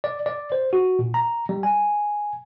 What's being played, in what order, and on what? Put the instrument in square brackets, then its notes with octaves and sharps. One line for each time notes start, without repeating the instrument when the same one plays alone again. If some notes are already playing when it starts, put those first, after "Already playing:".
[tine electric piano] D5
D5
C5
F#4
A#2
A#5
G3
G#5